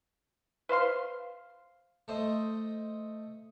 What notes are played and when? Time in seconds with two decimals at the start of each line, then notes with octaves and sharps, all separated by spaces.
0.69 B4 C5 F5 C6
2.08 A3 C5 D#5